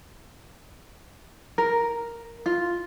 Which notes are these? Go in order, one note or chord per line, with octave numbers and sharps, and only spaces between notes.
A#4
F4